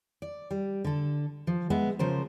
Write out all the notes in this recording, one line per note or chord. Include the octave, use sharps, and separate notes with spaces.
D5
G3
D3 A4
F3
G#3 B3 E5
C#3 F3 A#4 C5